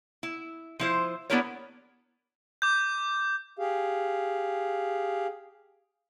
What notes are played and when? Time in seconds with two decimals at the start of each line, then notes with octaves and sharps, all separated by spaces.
0.23 E4
0.79 F3 E4 C5
1.30 B3 D4 E4 G4 A#4 C#5
2.62 D6 G6
3.59 G4 G#4 F5